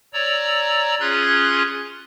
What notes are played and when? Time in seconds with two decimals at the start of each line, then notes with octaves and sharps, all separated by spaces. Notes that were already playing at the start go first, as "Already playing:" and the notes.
0.13 C#5 D5 A#5 E6
1.00 C#4 F4 G#4 C6 F#6 G#6